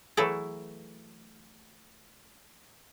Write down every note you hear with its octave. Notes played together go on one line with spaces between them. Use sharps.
E3 F#3 A3 E4 G#4 A4